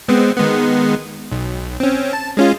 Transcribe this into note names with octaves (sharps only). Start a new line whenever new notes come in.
G#3 B3 C4
D#3 G#3 B3
B1
C4 C#4
A5
G#3 C#4 F4